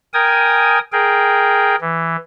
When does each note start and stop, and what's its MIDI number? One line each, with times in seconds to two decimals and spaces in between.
0.14 0.79 70
0.14 0.79 79
0.14 0.79 80
0.14 0.79 87
0.92 1.76 68
0.92 1.76 70
0.92 1.76 79
1.81 2.16 52